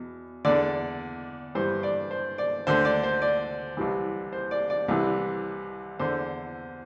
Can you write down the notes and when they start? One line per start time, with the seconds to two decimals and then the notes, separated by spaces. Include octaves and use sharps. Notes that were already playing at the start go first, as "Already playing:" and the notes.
Already playing: E2 B2
0.45 E2 D3 D5
1.55 G2 E3 C5
1.83 D5
2.11 C5
2.38 D5
2.67 D2 D3 C5
2.85 D5
3.03 C5
3.22 D5
3.77 C2 C3 E3
4.33 C5
4.51 D5
4.70 D5
4.88 C2 C3 E3
5.99 E2 D3 C5